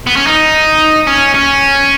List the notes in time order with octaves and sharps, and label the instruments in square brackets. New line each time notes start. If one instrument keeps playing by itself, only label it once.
[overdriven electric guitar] B3
C#4
D#4
C#4
C#4